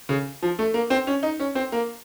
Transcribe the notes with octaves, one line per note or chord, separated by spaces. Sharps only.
C#3
F3
A3
A#3
C4
C#4
D#4
C#4
C4
A#3